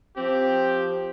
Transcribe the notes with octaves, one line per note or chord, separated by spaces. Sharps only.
F3 C4 G4